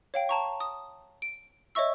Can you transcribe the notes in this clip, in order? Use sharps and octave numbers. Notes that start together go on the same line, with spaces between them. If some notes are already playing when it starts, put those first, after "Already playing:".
C#5 F5 G5
A5 A#5 C#6
D#6
D7
C#5 D#5 E5 C#6 E6